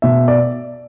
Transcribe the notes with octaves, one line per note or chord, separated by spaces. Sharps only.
B2 E5
D5